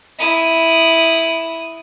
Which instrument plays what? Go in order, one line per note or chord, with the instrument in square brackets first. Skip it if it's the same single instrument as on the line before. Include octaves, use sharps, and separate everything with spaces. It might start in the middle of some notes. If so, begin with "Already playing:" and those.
[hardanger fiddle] E4 D#6